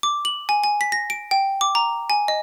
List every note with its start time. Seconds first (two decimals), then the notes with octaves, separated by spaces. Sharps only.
0.03 D6
0.25 F#7
0.49 G#5
0.64 G#5
0.81 B6
0.92 A#6
1.10 D7
1.31 G5
1.61 D6
1.75 A#5
2.10 G#5
2.28 D#5